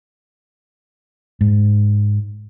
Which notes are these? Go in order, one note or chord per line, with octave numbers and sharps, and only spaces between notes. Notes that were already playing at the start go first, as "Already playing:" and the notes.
G#2